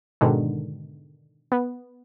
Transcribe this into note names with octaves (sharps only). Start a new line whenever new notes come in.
G#2 B2 D3 D#3 G#3
B3